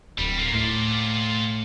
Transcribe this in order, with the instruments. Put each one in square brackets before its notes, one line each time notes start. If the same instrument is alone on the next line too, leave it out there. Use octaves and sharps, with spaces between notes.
[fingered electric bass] D1 [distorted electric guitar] G3
[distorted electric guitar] A#3 F4
[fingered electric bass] A2 [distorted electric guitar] F4 D5